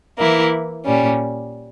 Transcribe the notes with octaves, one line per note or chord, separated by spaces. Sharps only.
E3 A#3 E4
A#2 G3 C#4